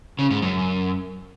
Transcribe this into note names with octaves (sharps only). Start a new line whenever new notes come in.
C#3
G#2
F#2